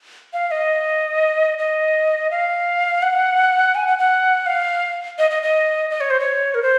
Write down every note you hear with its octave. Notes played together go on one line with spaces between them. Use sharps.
F5
D#5
D#5
F5
F#5
G#5
F#5
F#5
F5
D#5
D#5
D#5
D#5
C#5
C5
C#5
A#4
C5